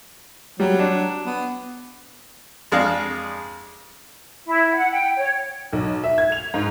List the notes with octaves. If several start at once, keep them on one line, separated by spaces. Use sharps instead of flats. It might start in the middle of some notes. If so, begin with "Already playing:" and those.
F#3 G3
D4
B3
F2 G#3 D4 F5
E4
F#5
G5
C#5
B1
E5
G#6
F7
G#2